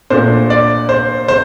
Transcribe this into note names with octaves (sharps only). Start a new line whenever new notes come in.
A#2 A3 D4 C5
D5
C5
C5